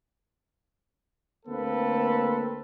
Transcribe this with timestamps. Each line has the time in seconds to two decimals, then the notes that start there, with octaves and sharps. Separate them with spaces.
1.46 D2 A#3 C4 A4 B4